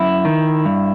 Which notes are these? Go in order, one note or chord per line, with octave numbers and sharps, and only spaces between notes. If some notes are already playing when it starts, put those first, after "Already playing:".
Already playing: F#2 E4
D#3
G2